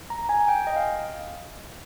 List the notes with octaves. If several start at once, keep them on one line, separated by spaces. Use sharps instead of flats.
A#5
G#5
G5
D#5
F5